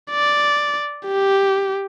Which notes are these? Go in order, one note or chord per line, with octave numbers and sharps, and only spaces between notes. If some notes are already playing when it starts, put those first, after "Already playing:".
D5
G4